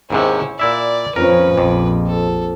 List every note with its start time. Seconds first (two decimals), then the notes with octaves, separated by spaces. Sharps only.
0.10 D#2 G#2 C3 C#4 E4
0.59 A#2 E4 D5 E5
1.16 F2 F3 C#4 A#4 B4
1.58 A#1 F2 D6
2.07 A4